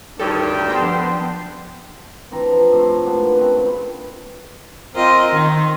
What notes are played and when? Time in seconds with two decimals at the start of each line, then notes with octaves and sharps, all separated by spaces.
0.20 D2 G2 C3 D#3 G3 A4 C#5 G5
0.70 F3 B3 C4 D4 C5 G5 C6
2.31 E3 C4 D4 A#5
2.52 F3
2.72 A2 C3 A5 C6
3.06 G#3 A#3 B3 D4
3.36 C4 C#4 B4
3.57 A#2 C#3 A#3
4.95 C4 F4 A#4 C5 D#5
5.32 D#3